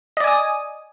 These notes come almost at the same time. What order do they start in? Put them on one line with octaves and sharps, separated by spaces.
D#5 D5 G#5 D#6